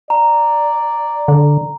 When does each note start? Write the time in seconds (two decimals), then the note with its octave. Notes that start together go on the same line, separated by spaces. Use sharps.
0.10 D5 A#5
1.28 D3